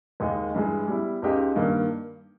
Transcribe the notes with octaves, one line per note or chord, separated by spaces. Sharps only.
D#2 D#3 G#3 D#4 G#4
G2 E3 G#3
G3 B3 E4
C#2 C#3 G#3 D#4 G4
G2 D#3 A#3